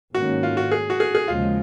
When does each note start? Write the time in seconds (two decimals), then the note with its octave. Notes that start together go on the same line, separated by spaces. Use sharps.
0.15 G#2 D#3 A#3 C#4 F#4
0.43 F4
0.57 F#4
0.72 G#4
0.90 F#4
1.00 G#4
1.15 G#4
1.28 D#2 C#3 F3 G#3 F4